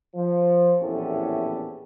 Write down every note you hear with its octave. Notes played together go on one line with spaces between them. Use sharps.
F3
A#1 E2 A2 C#4 G4 A4